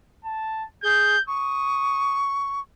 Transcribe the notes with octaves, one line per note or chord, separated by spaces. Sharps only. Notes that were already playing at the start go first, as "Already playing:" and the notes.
A5
G#4 G6
C#6 D#6